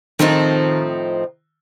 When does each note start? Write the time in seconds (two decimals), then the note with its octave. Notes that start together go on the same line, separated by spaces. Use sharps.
0.19 A2 D#3 F3 C4 D#4